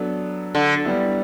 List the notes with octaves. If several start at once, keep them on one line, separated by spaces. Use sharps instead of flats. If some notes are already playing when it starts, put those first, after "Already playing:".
Already playing: F#3 B3 D4 A4
D3
G3 B3 E4